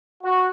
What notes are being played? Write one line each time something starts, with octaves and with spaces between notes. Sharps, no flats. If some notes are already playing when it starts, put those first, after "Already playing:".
F#4